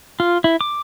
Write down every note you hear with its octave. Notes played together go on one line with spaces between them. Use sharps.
F4
E4
D6